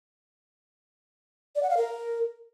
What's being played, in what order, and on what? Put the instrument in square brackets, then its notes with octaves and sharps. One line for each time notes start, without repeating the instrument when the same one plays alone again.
[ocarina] D5
F#5
F5
A#4